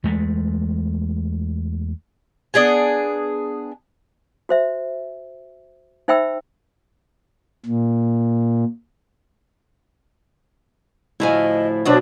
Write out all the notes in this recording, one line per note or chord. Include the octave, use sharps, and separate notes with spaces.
E2 G#3 A3
B3 D4 G#4 G#5
F#4 C5 E5
D#4 C5 E5 G5 B5 E6
A#2
D2 A2 F3 E4 D#5 G#5
B2 F#3 D4 F#4 C5 C#5